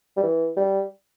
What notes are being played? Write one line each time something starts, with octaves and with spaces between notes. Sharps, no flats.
G3
E3
G3